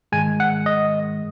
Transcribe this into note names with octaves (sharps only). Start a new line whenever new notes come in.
G#2 D#3 G#3 G#5
F#5
D#5